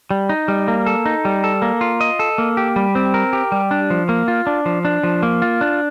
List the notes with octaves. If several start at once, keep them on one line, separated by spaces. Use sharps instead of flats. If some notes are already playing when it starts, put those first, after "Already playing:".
G3
D#4
G3
A#3
A4
D#4
G3
A4
A#3
F4
D#5
A4
A#3
G4
G3
C4
A#4
G4
G3
D4
F3
A#3
F4
D4
F3
D4
F3
A#3
F4
D4